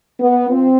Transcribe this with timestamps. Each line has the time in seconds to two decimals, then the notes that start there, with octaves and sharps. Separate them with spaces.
0.20 B3
0.49 F3 C4